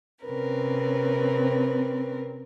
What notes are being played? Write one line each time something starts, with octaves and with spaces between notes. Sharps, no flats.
C3 C4 C#4 A#4 B4